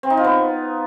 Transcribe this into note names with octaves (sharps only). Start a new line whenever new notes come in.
C4
D#4
F4
B3